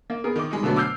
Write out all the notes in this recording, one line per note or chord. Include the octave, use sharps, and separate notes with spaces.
A#3
B3 G#4 A#4
D#3 D#4 D6
G3 G#3 D#4
B2 D3 F#3 A3 B3
D6 E6 F6 G6 C7